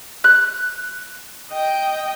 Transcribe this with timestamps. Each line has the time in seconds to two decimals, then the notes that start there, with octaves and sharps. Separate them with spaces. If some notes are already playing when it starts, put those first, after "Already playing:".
0.24 F#6
1.51 D#5 G5